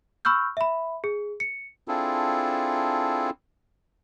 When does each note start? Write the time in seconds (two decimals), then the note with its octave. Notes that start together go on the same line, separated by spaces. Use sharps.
0.25 B5 C#6 E6 F6 G6
0.57 E5 B5
1.04 G#4
1.40 C#7
1.88 C4 D4 E4 F4 G#4 A4